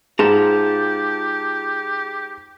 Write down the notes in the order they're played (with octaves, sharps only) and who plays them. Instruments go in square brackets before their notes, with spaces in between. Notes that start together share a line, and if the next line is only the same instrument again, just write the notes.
[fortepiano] G#2 [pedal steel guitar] F4 A5 A#5 [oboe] G4 [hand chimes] G#4